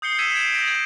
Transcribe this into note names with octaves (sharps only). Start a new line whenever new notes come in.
D#6 G6 C7 C#7 G7
E6 G#6 B6 C#7 D#7 E7
G6 G#6 C7 D7 E7
D#6 G6 A#6 D7
G#6